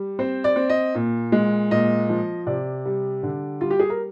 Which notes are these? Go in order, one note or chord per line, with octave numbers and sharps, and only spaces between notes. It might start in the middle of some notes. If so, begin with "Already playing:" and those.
Already playing: G3
C4 C5
D5
C4
D#5
A#2
G#3
A#2 D#5
F3
C3 D5
G3
D3
G3 F4
G4
G#4
A#4